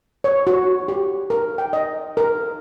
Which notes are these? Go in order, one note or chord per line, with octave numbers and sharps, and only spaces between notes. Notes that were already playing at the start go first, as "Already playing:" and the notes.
C#5
F#4
G4
A#4
G5
D#5
A#4